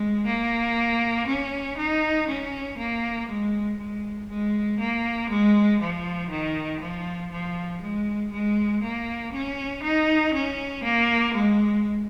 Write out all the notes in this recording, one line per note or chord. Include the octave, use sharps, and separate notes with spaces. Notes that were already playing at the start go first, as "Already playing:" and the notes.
Already playing: G#3
A#3
C#4
D#4
C#4
A#3
G#3
G#3
G#3
A#3
G#3
F3
D#3
F3
F3
G#3
G#3
A#3
C#4
D#4
C#4
A#3
G#3